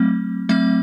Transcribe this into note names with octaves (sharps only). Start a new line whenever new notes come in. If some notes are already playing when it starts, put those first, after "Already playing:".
Already playing: F#3 A3 C4
F#3 A3 C4 E5